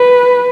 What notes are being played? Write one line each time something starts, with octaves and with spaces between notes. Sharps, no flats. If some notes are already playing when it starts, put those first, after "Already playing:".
Already playing: B4